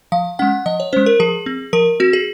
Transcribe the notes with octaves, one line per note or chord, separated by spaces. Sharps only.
F3 F5
G#3 C#4 F#5
F3 D#5
C#5
G#3 C#4 C5
A#4
F3 G#4
C4
F3 A#4
C4 F#4
G#4